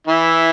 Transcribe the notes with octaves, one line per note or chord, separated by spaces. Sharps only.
E3 E4